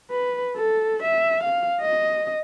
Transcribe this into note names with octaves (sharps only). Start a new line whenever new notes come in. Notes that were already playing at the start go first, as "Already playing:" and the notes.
B4
A4
E5
F5
D#5